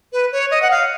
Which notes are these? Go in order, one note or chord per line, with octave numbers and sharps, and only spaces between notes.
B4
C#5
D#5
F#5
F5